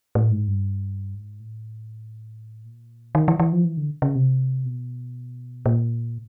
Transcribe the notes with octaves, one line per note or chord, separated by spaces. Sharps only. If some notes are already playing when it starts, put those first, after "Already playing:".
A2
G#2
G2
G#2
A2
A#2
D#3
E3
E3
F3
E3
D3
C#3
C3
B2
A#2